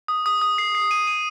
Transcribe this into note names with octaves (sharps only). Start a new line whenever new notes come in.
D#6
D#6
D#6
C7
C7
D#7
D#7